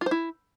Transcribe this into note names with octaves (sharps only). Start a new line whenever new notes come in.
F4
C5
E4